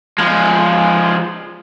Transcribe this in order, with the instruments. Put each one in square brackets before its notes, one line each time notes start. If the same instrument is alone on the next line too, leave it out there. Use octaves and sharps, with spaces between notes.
[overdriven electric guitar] F3 G#3